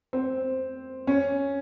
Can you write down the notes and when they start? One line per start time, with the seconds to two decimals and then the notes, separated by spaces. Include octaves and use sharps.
0.13 C4
1.07 C#4